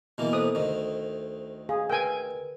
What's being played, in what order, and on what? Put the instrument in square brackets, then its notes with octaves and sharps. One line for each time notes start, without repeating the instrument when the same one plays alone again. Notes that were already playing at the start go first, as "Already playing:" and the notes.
[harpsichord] B2 E3 A#3
[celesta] A4 C5 [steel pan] D#6
[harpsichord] D2 D#3
[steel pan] G#4 [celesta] F5
[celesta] A#4 B4 [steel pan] G5 G#5